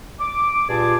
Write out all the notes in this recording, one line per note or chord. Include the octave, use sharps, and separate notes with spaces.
D6
G2 A#2 F4 G#4 A5 D6